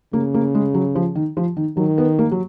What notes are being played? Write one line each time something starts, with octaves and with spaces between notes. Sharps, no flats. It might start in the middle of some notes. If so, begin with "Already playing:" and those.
C#3 A#3
A#3
G#3
F#3
F3
D#3
F3
D#3
D#3 F#3
B3
A#3
F#3